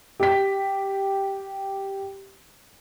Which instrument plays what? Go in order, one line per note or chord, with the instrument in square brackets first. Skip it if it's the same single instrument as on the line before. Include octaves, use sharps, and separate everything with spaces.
[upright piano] G4 B6